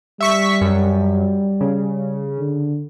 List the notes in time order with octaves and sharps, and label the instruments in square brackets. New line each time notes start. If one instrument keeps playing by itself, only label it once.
[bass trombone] G3 [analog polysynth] E5 C#6 B6
[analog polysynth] F#2
C#3
[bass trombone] D3